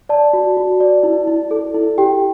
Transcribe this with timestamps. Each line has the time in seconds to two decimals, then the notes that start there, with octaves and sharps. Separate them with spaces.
0.09 D5 A5
0.33 F#4
0.57 F#4
0.80 D5
1.03 E4
1.28 E4
1.51 A4
1.75 E4
1.98 G4 G5